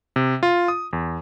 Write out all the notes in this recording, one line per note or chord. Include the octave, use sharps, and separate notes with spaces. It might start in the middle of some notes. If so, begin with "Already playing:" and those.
C3
F4
D#6
E2